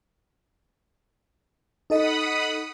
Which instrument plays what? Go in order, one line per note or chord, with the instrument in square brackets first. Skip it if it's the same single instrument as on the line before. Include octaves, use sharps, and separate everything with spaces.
[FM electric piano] D#4 A4 D#5 [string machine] F#5 B5 D#6